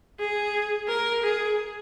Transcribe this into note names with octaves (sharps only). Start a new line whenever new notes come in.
G#4
A#4
G#4